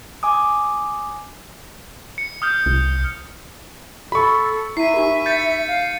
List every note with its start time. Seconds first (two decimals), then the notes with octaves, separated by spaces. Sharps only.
0.23 G#5 D6 D#6
2.18 C#7
2.42 D#6 F6 G6
2.66 C2
4.12 F#4 A4 B5 C#6
4.77 E4 E5 C7 D#7
4.94 D#4 G4 A#4
5.26 G6 A6 C#7
5.67 F5